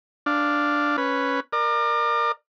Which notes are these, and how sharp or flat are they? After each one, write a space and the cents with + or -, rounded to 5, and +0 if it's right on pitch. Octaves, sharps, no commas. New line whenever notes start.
D4 +0 F5 +0
C#4 +0 B4 +0
A#4 +0 D5 +35